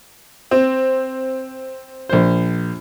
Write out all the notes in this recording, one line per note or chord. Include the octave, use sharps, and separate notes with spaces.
C4
A#1 C5